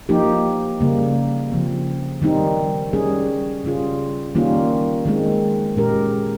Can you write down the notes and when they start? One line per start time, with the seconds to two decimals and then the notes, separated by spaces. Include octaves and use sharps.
0.09 F3 A#3 D#4 G4
0.81 C#3 G3 A#3
1.52 C#3 F3 C4
2.22 D#3 G3 C4 D#4
2.93 G3 C#4 G#4
3.64 C#3 G3 C#4 F4 G#4
4.35 D#3 G3 A#3 C#4 F4
5.06 D#3 G#3 C4
5.76 A#2 G#3 C#4 G4 A#4